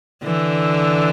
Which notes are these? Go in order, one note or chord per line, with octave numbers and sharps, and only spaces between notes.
D3 E3